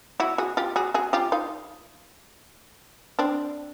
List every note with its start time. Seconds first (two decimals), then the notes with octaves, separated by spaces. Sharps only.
0.20 E4 F#4
0.38 F#4 G#4
0.57 F4 G4
0.76 F#4 G#4
0.94 F#4 G#4
1.13 F4 G4
1.32 D#4 F4
3.19 C4 D4